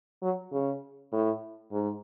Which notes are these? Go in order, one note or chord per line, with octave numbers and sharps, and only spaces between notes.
F#3
C#3
A2
G#2